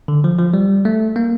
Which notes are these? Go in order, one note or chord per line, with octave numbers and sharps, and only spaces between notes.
D3
F3
F3
G3
A3
A#3